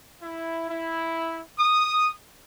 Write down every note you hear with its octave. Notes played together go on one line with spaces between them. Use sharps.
E4
E4
D#6